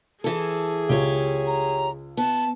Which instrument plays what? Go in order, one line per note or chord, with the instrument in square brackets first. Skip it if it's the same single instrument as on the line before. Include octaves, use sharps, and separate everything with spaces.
[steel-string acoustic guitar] E3 A4 [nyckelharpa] G#4
[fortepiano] C#2 [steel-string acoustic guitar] G4 C#5
[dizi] A#5
[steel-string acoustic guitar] B3 [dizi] A5